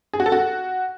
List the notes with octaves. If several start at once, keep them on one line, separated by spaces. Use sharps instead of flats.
G#4
F#4
A4
F#4